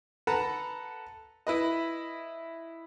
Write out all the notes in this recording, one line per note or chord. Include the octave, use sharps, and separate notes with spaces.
A4 B4 F#5 A5 A#5
E4 B4 D#5